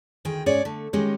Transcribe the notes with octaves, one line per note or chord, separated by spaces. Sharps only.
D2 D#3 G#4 G5
G#2 C#4 G#4 C#5 D5
D3 A3
D#3 G#3 C#4 G4